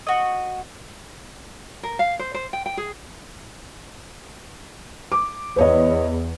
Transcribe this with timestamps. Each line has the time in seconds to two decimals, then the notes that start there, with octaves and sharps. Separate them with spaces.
0.07 F#4 D#5
1.83 A#4
1.99 F5
2.19 C5
2.34 C5
2.53 G5
2.66 G5
2.77 G#4
5.12 D6
5.56 E2 B4 C#5 D#5